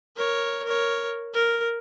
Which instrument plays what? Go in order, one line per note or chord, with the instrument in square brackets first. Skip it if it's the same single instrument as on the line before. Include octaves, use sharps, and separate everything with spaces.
[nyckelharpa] A#4 C#5
A#4 C#5
A#4